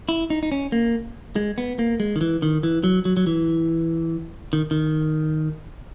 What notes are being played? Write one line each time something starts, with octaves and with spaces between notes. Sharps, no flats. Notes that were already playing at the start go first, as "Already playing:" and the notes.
E4
D#4
D#4
C#4
A#3
G#3
B3
A#3
G#3
D#3
E3
D#3
E3
F#3
F#3
F#3
E3
D#3
D#3